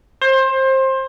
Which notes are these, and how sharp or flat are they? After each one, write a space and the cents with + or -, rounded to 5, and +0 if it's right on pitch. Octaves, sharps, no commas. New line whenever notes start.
C5 +25